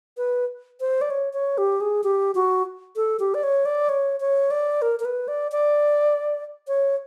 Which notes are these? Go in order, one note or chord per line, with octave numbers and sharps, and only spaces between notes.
B4
C5
D5
C#5
C#5
G4
G#4
G4
F#4
A4
G4
D5
C#5
D5
C#5
C#5
D5
A#4
A#4
B4
D5
D5
C#5